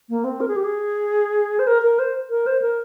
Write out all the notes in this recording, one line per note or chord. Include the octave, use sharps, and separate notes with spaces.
A#3
C4
A#4
G#4
G4
G#4
C5
A#4
A#4
C5
A#4
C5
A#4